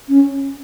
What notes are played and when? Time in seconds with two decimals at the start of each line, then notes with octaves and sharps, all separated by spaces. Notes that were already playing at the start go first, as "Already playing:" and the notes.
0.09 C#4